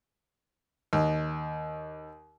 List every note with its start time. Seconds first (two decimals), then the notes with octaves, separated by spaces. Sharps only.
0.93 D#2